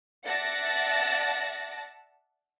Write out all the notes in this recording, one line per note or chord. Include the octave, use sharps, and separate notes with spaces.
D5 E5 F#5 A5 A6 A#6